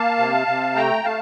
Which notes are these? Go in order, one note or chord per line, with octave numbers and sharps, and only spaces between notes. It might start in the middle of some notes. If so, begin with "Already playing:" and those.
Already playing: A#3 F5 A5
C3
C3
A3 G5 A#5
A3 F5 A5